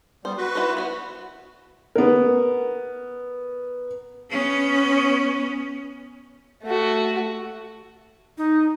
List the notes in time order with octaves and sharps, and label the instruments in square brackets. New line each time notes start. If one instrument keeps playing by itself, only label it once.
[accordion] G3 B3 [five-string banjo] C5
[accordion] F#4 B4
[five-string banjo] E4 C5
B3 F#4
[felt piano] B3 A#4
[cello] B3 C#4
[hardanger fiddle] A3 F#4
[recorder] D#4